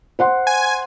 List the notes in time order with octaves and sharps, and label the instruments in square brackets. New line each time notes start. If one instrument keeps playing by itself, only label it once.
[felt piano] C5 F#5 C6
[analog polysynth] G#5